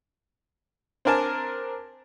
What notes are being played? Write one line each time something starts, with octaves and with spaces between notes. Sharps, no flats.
C4 D4 A#4 G#5 A5